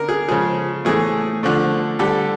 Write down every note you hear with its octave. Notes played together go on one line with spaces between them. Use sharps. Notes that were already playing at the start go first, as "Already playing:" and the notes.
Already playing: D3 A#4
G#4
C#3 F3 G#3 G#4
A2 E3 A3 G#4
D3 F3 A3
D3 G3 A4